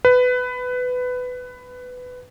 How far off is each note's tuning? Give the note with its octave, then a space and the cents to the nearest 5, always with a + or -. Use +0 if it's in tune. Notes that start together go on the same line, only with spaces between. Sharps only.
B4 +15